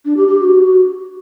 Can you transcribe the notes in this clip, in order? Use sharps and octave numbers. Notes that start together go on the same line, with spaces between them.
D4
G4
G4
F#4